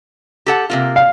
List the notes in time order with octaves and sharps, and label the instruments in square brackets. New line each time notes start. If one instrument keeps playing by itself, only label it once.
[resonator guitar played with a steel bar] G4 A4 F#5
C3 A#3 F4
[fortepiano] F5